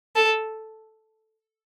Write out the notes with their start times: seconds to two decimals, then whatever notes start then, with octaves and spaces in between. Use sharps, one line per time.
0.16 A4